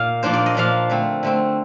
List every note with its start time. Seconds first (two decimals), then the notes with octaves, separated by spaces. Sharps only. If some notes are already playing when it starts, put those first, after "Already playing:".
Already playing: A#2 F5
0.23 A#2 F3 A#3 D4 C5
0.34 D5
0.46 D#5
0.54 A#2 F3 A#3 D4 F5
0.90 D3 A3 C4
1.23 D3 A3 C4